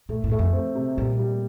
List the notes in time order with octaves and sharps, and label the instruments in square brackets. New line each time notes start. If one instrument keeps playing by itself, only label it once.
[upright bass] A#2 [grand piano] A3
[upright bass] A2
[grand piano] A3
[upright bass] F2
[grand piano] C4
C3
[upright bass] A#2 [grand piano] G3
[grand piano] G3